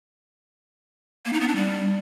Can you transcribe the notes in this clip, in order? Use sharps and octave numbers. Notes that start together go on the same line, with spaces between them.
A#3
D#4
B3
D4
G3